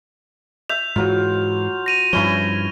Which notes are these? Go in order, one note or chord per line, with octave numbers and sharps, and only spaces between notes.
E5 G6 F7
G#2 E3 F#3 F4
A#6 D#7 F7
G2 F3 C#4 E4 A#5 G7